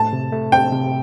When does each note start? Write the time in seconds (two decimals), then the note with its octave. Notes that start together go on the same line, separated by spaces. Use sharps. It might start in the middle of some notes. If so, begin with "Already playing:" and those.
Already playing: A2 A3 A5
0.13 C3
0.32 A3
0.52 C4 G5
0.73 C3